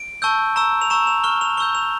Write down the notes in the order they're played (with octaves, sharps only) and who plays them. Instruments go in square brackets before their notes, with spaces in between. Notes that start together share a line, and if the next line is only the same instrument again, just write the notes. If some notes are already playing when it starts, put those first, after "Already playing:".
Already playing: [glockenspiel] D7
A5 C#6 E6 G6
A#5 C#6 E6
F7
A#5 C#6 E6 E7
F7
C#6 F6 G7
F7
C#6 E6 G6 G7
F7